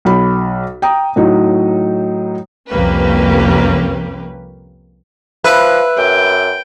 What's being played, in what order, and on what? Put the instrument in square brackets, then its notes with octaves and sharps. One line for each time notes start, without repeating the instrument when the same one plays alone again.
[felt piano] B1 B5
G5 A#5 D#6
A2 F#3 D#4
[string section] C2 F2 A#3 C#4 G4 B4
[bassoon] F3 [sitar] B4 [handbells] E5 E6 F#6
[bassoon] F#2 [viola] G5